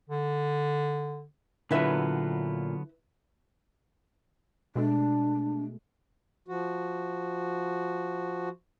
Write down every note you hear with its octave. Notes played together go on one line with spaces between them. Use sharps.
D3
A#2 D3 F#3 B3 E4 F4 B4 E5
B2 G#3 A3 D4
F3 F#4